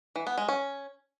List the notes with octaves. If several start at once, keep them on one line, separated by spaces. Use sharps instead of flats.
E3
B3
G#3
C#4